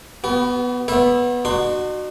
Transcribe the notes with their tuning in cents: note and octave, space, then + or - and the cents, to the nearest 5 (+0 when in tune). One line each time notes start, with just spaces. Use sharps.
B3 +0 F#4 +45
B3 -10 C#5 -45 E5 +0
D#4 -45 F#4 +5 C6 +0